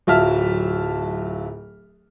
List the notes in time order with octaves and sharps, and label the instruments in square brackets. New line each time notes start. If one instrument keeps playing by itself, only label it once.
[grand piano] D1 F#3 F4 E5 A5 F6